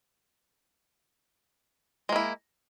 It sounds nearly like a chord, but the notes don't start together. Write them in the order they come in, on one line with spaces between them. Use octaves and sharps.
G#3 A#3 E4